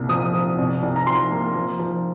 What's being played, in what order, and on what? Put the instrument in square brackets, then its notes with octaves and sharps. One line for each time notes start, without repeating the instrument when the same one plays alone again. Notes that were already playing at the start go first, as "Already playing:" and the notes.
Already playing: [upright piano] C2 A#2
F3 D#6
F3
C2
C2
A#5
F3 C6
A#3
F3
F3